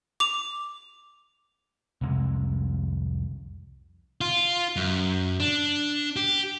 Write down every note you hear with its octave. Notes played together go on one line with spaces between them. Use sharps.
D6 F7
C2 F2 C3 G#3
F4
F#2
D4
G4